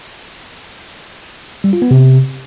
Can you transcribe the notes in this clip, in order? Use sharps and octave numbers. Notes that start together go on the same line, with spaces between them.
G3
F4
B3
C3